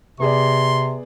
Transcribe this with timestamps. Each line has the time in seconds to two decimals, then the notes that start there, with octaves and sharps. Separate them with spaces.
0.20 C3 B3 G#4 D5 C6